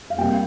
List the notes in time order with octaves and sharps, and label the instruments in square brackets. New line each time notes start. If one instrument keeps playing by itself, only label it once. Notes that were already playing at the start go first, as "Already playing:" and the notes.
[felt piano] F5
C3 G3 A#3 G5